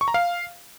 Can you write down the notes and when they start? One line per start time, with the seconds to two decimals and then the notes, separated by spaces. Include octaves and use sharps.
0.01 C#6
0.08 A#5
0.14 F5